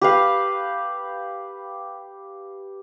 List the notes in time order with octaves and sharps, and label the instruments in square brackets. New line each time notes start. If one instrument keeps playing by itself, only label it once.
[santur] G4 B4 F5